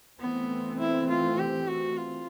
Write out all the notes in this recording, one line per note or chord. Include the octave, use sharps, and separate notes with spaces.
E3 A3 B3 C4
E4
F4
G4
F#4
F4